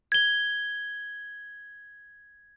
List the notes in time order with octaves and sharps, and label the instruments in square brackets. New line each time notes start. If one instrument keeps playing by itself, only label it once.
[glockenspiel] G#6 G7